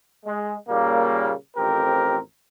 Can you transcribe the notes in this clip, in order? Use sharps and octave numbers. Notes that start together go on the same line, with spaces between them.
G#3
A#2 C#3 G3 A#3
A1 F2 C4 G4 A#4